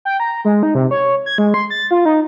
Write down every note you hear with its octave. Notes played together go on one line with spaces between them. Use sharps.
G5
A#5
G#3
D#4
C3
C#5
G#6
G#3
C6
A6
F4
D#4